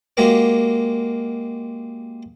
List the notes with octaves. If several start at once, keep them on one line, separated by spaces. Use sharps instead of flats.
G#3 A#3 F#4 G4 A#4 C#5